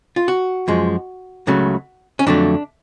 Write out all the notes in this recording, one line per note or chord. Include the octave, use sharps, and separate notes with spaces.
F4
F#4
F#2 F3 G#3
C#2 C#3 F#3 A3
C#4
F2 D3 F#3 A3 D4